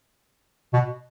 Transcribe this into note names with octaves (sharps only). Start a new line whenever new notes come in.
B2